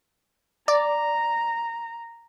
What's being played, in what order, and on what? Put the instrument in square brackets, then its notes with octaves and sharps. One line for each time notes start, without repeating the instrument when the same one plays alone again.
[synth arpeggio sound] D5 [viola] A#5